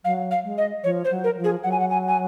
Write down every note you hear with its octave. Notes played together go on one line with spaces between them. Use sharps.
F#3 F5
F5
G#3
D#5
F3 C#5
C5
F#3
A#4
F3
G#4
F#3 F#5
G#5
F#5
G#5
G#5